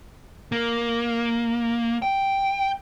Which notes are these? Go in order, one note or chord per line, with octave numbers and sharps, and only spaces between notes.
A#3
G5